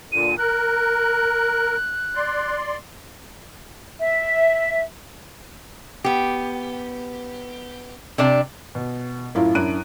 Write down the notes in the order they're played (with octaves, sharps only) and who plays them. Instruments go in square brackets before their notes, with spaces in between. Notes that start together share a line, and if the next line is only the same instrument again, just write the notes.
[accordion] A#2 D3 [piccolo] D#7
[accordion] A#4 [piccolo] F#6
[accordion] D5 C6
[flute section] E5
[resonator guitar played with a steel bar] B3 G4
C3 D4 D5
[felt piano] B2
F#2 A2 E4 F4
F#2 D4 E4 F#6 D7 D#7